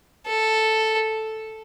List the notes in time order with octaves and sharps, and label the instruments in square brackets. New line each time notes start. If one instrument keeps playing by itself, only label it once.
[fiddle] A4